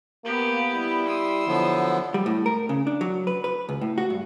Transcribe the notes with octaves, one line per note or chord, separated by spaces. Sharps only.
A#3 B3 G4
G3 E4
C6 D#6 E6
D3 F3 F#3 B3
G3
A2
A#4
C#3
D4
F#3
B4
B4
C#2
A2
F#4
G2